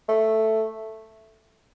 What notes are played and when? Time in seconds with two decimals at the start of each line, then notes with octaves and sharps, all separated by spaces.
0.08 A3